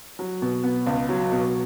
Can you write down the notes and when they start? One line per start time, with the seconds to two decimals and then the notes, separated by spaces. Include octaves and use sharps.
0.19 F#3
0.42 B2
0.64 B3
0.86 C#2
1.09 F#3
1.32 B2